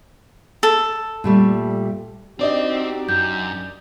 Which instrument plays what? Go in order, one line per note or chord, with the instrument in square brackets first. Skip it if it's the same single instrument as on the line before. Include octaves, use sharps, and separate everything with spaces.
[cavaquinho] A4
[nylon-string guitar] A#2 G3 A3
[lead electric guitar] C4 [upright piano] D4 D5 D#5 [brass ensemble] D#4 F#4 G4
[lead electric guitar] F#2 [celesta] G6